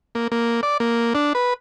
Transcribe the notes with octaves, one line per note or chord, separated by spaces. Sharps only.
A#3
A#3
D5
A#3
D4
B4